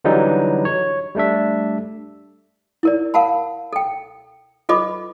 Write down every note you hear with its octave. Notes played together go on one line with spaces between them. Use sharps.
D3 E3 F#3 G3 D#4
C#5
G3 A3 D4 E5
E4 A#4 D5
A#4 F5 F#5 A5 B5
A4 G5
F4 A4 B4 D#5 B5 D6